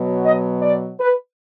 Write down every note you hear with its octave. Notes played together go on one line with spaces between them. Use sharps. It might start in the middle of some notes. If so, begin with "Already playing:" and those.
Already playing: B2 F#3
D#5
D5
B4